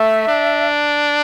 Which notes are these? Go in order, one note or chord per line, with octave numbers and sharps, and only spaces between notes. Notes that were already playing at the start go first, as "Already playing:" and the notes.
Already playing: A3 E5
D4